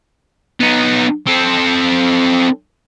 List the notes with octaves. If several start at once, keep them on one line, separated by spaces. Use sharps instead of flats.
B3 D#4
C4 A4